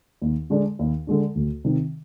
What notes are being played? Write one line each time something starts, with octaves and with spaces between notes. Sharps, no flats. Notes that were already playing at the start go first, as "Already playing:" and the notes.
D#2
D3 G#3 D4
D#2
D3 G#3 D4
D2
C3 D#3